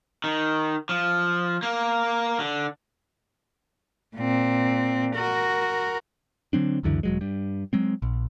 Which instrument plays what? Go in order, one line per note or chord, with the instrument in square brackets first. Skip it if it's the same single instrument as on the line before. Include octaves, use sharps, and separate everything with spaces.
[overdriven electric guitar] D#3
F3
A#3
D3
[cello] A#2 C4
F#4 A#4
[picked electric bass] D3 F#3 C4 D4
C#2 F#2 D3 E3
E1 F#3 G#3
G2 G3
F#3 G#3 C4
A#1